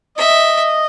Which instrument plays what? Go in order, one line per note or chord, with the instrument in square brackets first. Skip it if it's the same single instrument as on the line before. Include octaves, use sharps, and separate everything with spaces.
[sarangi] D#5 [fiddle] E5